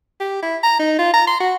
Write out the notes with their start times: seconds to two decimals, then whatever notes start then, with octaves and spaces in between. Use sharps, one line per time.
0.20 G4
0.43 E4
0.63 A#5
0.79 D#4
0.99 F4
1.14 A#5
1.27 C6
1.40 F#4